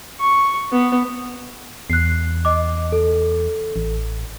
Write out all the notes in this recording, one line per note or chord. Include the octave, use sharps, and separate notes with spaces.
C#6
B3
E2 F#6 C7
D#5 D6
A4
A1